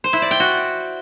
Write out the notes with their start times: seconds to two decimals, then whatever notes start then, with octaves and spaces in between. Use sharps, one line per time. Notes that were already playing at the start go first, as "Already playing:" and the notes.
0.04 C5
0.13 E4
0.22 D5
0.31 G5
0.40 F#4